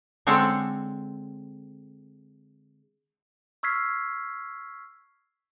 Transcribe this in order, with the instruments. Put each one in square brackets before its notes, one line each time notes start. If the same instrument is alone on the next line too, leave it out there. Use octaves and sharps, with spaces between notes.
[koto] D3 G#3 C4 A4 C#5
[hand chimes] C#6 E6 F6 G#6 B6 C7